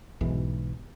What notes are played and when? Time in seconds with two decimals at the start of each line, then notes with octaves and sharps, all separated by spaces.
0.21 B1 G#2 E3